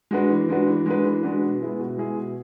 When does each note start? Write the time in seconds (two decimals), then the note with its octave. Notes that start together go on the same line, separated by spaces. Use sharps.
0.11 G#3 D4 F#4 B4
0.29 E3
0.49 G#3 D4 F#4 B4
0.67 E3
0.86 G#3 D4 F#4 B4
1.04 E3
1.23 G#3 D4 F#4 B4
1.41 B2
1.60 G#3 B3 E4 G#4
1.79 B2
1.98 G#3 B3 E4 G#4
2.16 B2